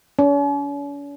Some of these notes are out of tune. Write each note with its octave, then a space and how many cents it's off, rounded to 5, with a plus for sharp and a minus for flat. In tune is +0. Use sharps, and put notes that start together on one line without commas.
C#4 +45